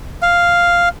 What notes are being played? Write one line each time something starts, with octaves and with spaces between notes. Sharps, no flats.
F5